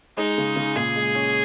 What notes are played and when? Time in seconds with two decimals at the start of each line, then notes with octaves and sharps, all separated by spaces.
0.17 G#3 D#4
0.38 C#3
0.56 C#3
0.76 A#2 G#4
0.96 G#3
1.15 C#4